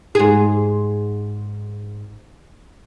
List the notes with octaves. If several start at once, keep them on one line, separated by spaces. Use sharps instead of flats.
G#2 G#4